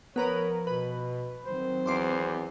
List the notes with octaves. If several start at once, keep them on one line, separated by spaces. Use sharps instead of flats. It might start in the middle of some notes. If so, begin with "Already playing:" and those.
F3 B3 A#4 B4 C#5
B2 B4
D#3 F#3 C4 C5
E2 C6 D6 C7